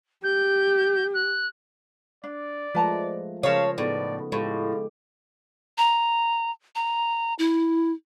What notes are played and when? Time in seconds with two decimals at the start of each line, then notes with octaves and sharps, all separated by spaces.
0.23 G4 G6
1.13 F#6
2.24 D4 D5
2.75 F3 G#3 A3 B4 A5 A#5
3.43 C#3 F3 G#4 A#4 C5 C#5 F5 A5
3.78 A2 B3 D#4 D5
4.32 A2 G#3 F4 G4
5.78 A#5
6.75 A#5
7.39 E4